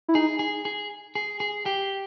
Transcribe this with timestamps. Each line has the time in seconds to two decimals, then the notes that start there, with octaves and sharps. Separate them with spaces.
0.08 E4
0.14 D#4 G#4
0.39 G#4
0.65 G#4
1.15 G#4
1.40 G#4
1.66 G4